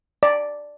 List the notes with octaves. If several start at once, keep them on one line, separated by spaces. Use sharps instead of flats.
D5